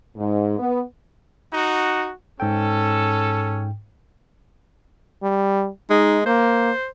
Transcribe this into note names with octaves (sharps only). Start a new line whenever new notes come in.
G#2
B3
D#4 F#4
G#2 C#4 A4 G5
G3
G#3 D#4
A#3 C5